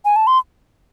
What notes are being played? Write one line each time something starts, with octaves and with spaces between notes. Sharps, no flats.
G#5
A5
C6